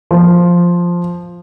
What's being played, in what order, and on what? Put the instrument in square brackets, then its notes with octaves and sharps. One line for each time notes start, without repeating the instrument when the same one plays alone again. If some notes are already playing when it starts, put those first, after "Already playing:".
[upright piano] F3